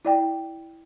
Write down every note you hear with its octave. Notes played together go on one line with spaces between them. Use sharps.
E4 D5 G5